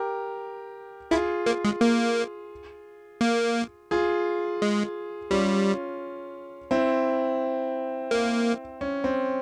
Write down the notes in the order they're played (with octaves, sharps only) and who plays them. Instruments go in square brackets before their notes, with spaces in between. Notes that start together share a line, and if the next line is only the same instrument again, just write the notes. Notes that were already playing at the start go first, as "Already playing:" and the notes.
Already playing: [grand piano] G4 A#4
[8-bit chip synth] E4 [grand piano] F4 G#4
[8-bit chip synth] A#3
G#3
A#3
A#3
[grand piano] F4 G#4
[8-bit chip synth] G#3
[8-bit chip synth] G3 [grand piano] C#4 F4
[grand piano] C4 E4
[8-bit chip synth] A#3
[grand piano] C#4
C4